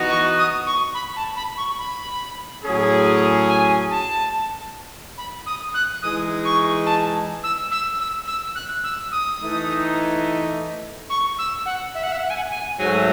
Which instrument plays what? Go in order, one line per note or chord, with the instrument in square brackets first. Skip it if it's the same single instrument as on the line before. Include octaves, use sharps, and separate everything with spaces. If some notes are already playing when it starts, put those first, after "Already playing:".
Already playing: [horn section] E3 B3 D#4 F#4
[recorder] C#6
D#6
C#6
B5
A5
B5
C#6
B5
[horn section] A2 F#3 C#4 G#4
[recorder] G#5
A5
B5
D#6
F#6
[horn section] E3 G#3 D#4 G#4 [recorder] D#6
[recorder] C#6
A5
E6
E6
E6
E6
F#6
E6
D#6
[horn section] E3 A3 D#4
[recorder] C#6
E6
F#5
E5
F#5
E5
F#5
G#5
F#5
G#5
[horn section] G#2 F#3 A3 [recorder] G#5